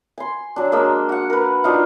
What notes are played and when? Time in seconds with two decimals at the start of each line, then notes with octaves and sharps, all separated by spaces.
0.18 G#5 C6
0.56 F#3 D4
0.72 G#3 A#3 D4 E6
1.09 F#4 F#5
1.30 A#4 B4
1.64 D4 D#4 F4